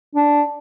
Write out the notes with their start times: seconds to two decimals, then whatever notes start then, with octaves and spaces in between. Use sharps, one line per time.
0.15 D4